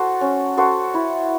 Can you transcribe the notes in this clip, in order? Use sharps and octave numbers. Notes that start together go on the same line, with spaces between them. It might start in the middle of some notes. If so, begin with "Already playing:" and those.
Already playing: F#4 A4 C5
C#4
F#4 A4 C5
E4